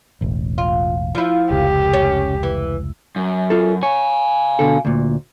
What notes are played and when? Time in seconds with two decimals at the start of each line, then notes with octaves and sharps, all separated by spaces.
0.21 E1 A1
0.58 F4
1.15 F3 E4
1.50 F1 C#2 G4
1.93 C#4
2.43 E3
3.16 F#2
3.50 F4 A4
3.83 C#5 F5 G#5
4.59 B2 D3 A4
4.85 D2 A#2